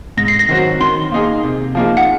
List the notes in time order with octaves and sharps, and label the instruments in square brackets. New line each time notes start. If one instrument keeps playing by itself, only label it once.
[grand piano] G#2 [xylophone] A#6
[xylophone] C7
A#6
[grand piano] D#3 F#3 C4 F#4
[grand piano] D#3 [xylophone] C6
[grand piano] A#3 D#4 G#4
C3
F3 A#3 D#4 G#4
[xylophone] F#5